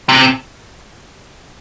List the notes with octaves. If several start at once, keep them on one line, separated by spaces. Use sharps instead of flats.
C3